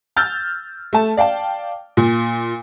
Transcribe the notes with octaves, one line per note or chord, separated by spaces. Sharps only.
E6 F6 G6 A6
A3 A5
D5 F5 G5 A5
A#2